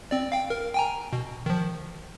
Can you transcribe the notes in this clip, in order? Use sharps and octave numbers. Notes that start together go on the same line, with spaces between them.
C4 D5
F5 G5
A#4
G5 G#5 A#5
B2
D#3 F3